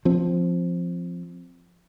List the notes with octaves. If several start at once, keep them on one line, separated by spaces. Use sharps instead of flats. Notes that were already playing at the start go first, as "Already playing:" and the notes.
F3 C4